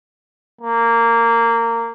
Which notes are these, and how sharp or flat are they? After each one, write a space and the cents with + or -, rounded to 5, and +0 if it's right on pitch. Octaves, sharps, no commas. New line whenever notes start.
A#3 -15